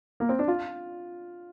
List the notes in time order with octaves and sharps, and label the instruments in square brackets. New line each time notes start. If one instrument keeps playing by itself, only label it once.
[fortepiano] A#3
C4
D4
F4